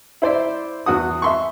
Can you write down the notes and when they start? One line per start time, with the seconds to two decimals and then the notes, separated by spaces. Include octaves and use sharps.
0.22 E4 C5 D5 E5
0.86 E2 F#4 F#5 D#6
1.22 E5 C6 C#6